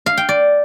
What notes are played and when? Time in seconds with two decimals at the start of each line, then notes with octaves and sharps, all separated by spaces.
0.06 F5
0.18 G5
0.29 D5